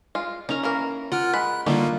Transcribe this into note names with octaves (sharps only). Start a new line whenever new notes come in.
G#3 F4
C#4 D#4 A#4 A#5
E3 A#3 A#4
F4 A#4 F#5 F6
G#3 B5 F#6
D3 G3 A3 A#3 D4 D#4 F4 D5